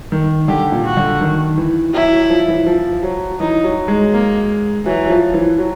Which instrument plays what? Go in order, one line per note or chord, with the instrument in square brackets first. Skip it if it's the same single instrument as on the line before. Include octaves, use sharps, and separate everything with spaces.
[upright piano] D#3
[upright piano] D3 [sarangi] G4
[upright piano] A#2
[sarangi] F#4
[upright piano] D3
D#3
E3
[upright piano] F#3 [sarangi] E4
[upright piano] F#3
F3
E3
F3
F#3
[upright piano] E3 [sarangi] D#4
[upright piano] F#3
G#3
[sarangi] A#3
[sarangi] E3 [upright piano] F#3
[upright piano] F#3
F3
E3
F#3